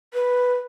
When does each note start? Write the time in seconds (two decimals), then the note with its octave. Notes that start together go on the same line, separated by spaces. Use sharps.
0.14 B4